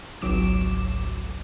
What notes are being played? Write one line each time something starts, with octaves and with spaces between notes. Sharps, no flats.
G#1 C#2 F#3 D6 E7